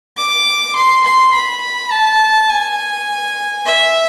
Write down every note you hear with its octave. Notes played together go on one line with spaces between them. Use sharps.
D6
C6
C6
B5
A5
G#5
E5